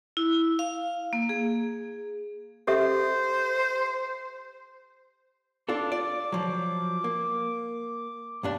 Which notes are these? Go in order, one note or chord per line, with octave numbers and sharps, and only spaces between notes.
E4
F5
A#3
G#4
G4 A4 C5 E5
D4 F4 A4 D6
D5
F3 F#3
A#3
B1 G2 D4